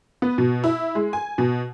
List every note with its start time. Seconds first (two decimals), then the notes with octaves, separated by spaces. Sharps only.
0.22 B3
0.38 B2
0.64 E4
0.95 G#3
1.13 G#5
1.38 B2